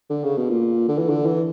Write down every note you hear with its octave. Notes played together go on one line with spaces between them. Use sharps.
D3
C#3
B2
A#2
D3
E3
D3
E3